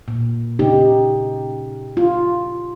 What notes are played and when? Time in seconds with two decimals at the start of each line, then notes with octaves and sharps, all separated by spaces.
0.08 A#2
0.59 C#3 D#4 G4
1.97 F4